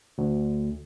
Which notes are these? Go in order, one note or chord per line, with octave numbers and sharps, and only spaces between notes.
D2